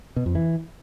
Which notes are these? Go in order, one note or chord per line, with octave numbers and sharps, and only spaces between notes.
B2
F2
E3